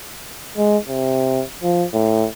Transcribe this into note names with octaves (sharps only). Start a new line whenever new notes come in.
G#3
C3
F3
A2